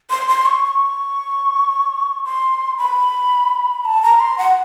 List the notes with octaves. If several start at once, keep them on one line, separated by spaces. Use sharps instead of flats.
C6
C6
C#6
C#6
C6
B5
A5
A#5
C6
F#5